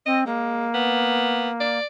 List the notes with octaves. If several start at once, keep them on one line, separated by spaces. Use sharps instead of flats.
C4 D#5
G#3 A#3
B3
D5